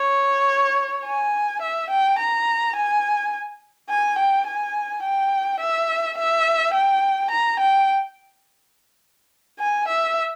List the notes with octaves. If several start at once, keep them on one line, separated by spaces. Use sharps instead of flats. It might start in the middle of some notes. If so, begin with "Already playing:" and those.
Already playing: C#5
G#5
E5
G5
A#5
G#5
G#5
G5
G#5
G5
E5
E5
G5
A#5
G5
G#5
E5